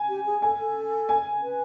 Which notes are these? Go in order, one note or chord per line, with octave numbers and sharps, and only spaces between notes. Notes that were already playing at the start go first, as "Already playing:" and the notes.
Already playing: G#5
G4
G#4
A4 G#5
A4
G#5
B4